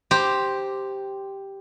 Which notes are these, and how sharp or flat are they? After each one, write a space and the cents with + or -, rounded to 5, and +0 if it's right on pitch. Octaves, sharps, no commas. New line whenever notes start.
G4 +0 C5 +0 A#5 +0